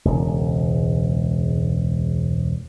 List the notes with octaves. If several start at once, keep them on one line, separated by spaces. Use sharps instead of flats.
E1 C#2